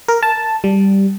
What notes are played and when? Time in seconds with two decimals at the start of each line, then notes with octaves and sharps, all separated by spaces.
0.08 A#4
0.23 A5
0.64 G3